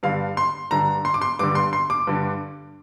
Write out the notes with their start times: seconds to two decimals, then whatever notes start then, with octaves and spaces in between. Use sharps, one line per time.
0.03 G2 D3 F5
0.37 C6
0.71 G2 D3 A#5
1.05 C6
1.14 D6
1.22 C6
1.39 G2 D3 D6
1.55 C6
1.73 C6
1.90 D6
2.07 G2 D3